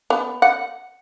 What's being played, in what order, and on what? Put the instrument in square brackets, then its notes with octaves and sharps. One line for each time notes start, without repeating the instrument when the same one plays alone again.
[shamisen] B3
F#5